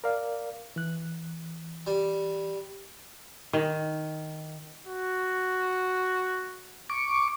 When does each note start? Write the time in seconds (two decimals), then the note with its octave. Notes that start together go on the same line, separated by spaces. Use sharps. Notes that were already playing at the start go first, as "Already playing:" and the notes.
0.04 A#4 D5 F5
0.76 E3 F#6
1.87 G3
3.53 D#3
4.87 F#4
6.90 C#6 D6